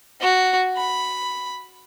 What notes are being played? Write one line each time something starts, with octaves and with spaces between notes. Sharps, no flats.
F#4
B5